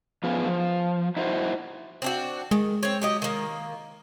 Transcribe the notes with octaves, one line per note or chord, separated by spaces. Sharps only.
F3 A3 B3 F4 G#4
F3
D#4 E4 F#4 C5
C4 D4 F#4
D#3 G#3
C4 C#5
F#3 G4 D#5
D#3 A#3